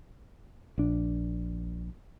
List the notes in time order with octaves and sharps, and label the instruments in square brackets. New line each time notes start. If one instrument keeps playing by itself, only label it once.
[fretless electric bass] A#1 D4